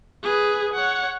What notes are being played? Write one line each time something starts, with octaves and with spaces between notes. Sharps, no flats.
G#4 B4
C#5 F#5